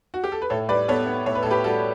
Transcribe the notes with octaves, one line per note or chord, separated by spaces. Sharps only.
F#4
G4
A4
B4
A2 A4 C#5
G3 B4 D5
B3 A4 C#5
B3
A2 C#5
B4
A2 A4
G4 B4
G3 F#4 A4